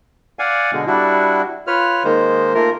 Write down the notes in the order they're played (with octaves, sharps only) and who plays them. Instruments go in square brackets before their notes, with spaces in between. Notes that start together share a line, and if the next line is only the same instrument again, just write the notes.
[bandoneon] D5 F5 F#5 G#5
B2 D3 G#3
G3 D4 E4 F#4
F4 B4 C#5 F6
D#3 G#3 A#3 C5
A3 A#3 F4 A#4